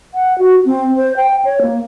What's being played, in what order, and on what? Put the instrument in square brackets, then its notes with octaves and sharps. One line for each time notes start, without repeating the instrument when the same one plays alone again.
[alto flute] F#5
F#4
C4
C5
G5
C#5
A#3